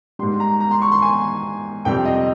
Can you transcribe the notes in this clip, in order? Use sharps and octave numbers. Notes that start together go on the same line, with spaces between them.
G#2 G3 C6
A#5
A#5
C6
C#6
C6
G#5
F2 C3 G3 G5
D#5